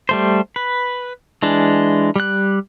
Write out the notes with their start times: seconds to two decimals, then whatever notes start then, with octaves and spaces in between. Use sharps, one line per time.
0.09 G3 A3 C5
0.56 B4
1.43 E3 G#3 D4
2.16 G3 F#6